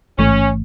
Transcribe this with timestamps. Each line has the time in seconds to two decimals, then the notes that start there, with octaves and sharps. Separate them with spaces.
0.18 A1 G#2 E3 A3 C#4